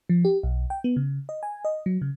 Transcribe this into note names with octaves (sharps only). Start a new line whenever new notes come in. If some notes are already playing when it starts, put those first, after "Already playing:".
F3
G4
B1
G5
B3
C#3
D#5
G#5
D#5
F#3
C#3